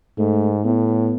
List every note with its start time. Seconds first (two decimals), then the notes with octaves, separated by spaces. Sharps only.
0.18 G#2 A3
0.64 A2 B3